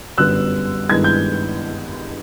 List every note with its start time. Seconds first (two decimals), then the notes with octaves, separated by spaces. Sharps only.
0.17 G1 F#2 D3 G3 B3 E6 F#6
0.89 G2 D#3 G#3 B3 E4 G#6
1.04 G6